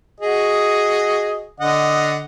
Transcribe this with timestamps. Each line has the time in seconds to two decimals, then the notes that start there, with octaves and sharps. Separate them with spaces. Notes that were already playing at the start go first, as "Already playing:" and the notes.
0.20 F#4 G#4 D#5
1.60 D3 D#5 F#5